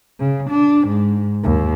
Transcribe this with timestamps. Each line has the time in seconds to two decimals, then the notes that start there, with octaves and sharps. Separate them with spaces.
0.19 C#3
0.51 D4
0.88 G#2
1.43 D#2